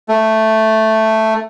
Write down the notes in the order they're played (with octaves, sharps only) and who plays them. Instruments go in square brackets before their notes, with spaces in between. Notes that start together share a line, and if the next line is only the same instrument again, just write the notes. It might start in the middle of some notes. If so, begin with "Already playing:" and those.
[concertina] A3